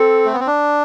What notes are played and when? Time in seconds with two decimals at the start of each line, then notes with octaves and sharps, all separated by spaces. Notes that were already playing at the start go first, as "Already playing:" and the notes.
Already playing: C4 A4
0.26 A3
0.33 B3
0.40 C4
0.47 D4